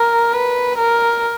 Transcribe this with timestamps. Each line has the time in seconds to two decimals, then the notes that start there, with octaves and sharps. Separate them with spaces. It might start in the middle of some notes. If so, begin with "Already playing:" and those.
Already playing: A#4
0.33 B4
0.78 A#4